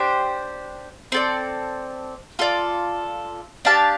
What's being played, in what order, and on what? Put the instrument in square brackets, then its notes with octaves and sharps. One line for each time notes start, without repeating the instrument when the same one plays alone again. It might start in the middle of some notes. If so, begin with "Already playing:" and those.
Already playing: [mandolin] D4 G4 C5
C4 A4 D5
F4 A4 D5
D4 G4 F5 A5